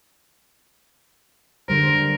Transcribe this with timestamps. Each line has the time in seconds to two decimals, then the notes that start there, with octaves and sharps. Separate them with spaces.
1.68 D3 G3 A#4 C5